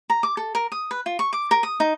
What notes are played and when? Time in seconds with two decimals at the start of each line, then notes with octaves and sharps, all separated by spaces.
0.10 A#5
0.23 D6
0.37 A4
0.55 A#4
0.72 D#6
0.91 B4
1.06 F4
1.19 C#6
1.33 D6
1.51 A#4
1.63 D#6
1.80 D#4